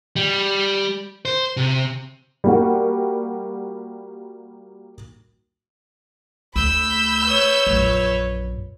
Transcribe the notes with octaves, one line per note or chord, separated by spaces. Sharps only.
G3
C5
C3
G3 A#3 F#4
D2 B5 E6 G6
B4 C#5
A#1 F#2